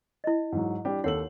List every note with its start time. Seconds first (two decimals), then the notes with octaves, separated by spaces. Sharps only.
0.24 E4 D#5
0.52 G#2 F#3
0.85 G3 D4 G4
1.04 D#2 A4 C#5 F#5 F#7